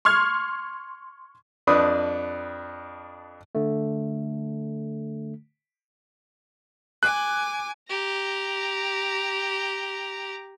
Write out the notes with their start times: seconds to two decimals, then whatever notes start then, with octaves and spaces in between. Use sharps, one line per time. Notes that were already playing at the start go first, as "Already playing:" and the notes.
0.05 C6 C#6 F6 G#6
1.67 F2 D4 B4 D#6
3.55 D3 A3
7.03 G#5 D6 F#6
7.89 G4 A#5